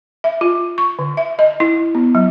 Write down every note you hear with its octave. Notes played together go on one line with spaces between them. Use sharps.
E5
F4
C#6
D3
E5
D#5
E4
B3
F#3